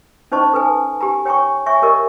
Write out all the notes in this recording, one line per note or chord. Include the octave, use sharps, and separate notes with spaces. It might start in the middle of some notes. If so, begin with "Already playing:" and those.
C#4 D#4 C5 D#5 A5 C#6
A4 B4 G#5
G4 G#5 A#5
C#5 G5 G#5 A#5 C#6
C#5 E5 G#5 C#6
G4 A#4 D#5 C#6